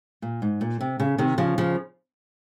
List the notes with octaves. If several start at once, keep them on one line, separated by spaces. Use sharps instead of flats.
A#2
G#2
A#2
C3
C#3
C3 D#3
C#3 F3
C#3 F3